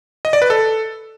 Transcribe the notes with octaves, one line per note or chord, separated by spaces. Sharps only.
D#5
D5
B4
A4